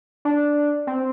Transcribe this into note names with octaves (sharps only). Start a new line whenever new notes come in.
D4
C4